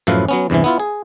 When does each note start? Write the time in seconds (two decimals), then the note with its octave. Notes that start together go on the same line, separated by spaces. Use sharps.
0.07 F#2 A2 F3 E4 B4 F5
0.29 F#3 B3 C#4
0.50 E2 G2 C3 E3
0.64 B3 E4 F4
0.80 G#4